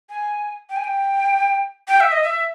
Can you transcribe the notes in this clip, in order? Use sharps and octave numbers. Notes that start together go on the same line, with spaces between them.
G#5
G5
G#5
G5
G5
E5
D#5
E5